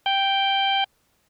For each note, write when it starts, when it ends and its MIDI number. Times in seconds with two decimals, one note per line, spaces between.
0.06 0.84 79